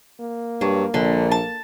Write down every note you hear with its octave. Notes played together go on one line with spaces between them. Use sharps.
A#3
G2 F#3
A#1 D3
A5